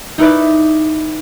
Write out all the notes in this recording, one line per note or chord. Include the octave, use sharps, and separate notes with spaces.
D#4 E4 B4 D5